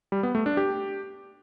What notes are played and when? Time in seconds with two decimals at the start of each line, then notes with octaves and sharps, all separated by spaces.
0.12 G3
0.23 B3
0.35 A3
0.46 D4
0.57 G4